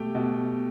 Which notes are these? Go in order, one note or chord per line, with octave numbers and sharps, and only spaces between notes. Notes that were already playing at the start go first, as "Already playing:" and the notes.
Already playing: B2 A3 G4 G5
B2